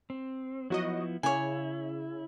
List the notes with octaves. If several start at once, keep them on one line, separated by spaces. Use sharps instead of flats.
C4
F3 F#3 B3 E4 F#4 D#5
C#3 E4 C#5 G#5